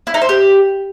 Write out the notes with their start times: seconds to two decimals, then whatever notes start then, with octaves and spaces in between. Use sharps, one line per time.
0.07 E4
0.14 D#4
0.22 C5
0.29 G4